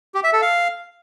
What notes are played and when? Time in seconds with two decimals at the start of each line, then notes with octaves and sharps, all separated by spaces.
0.15 G4
0.24 E5
0.33 A4
0.42 F5